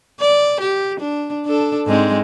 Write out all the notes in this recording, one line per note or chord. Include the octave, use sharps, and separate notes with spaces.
D5
G4
D4
D4 A4
G#2 G#3 C4